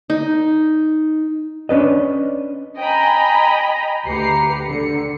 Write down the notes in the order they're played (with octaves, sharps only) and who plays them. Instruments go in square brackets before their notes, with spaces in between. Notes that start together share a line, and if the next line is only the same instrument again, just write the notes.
[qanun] D#4
[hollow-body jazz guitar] C#4 D4 B4 D#5
[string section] D#5 G5 G#5 A#5 B5
D2 G4 B4 A#5 C7 C#7
D3 C#7